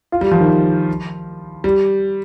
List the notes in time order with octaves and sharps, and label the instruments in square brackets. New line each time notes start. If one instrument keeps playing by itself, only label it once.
[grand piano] F4
G3
F3
D#3
G3